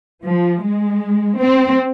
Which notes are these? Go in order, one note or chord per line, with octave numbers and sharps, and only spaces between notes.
F3
G#3
C4